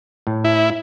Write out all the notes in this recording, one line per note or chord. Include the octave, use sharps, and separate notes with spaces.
A2
E4